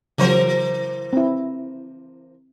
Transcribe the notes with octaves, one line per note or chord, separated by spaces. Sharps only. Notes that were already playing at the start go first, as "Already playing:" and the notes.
C#3 E3 F#3 A#4 C5
C4 E4